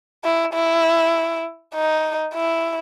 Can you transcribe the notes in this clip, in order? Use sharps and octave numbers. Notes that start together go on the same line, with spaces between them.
E4
E4
D#4
E4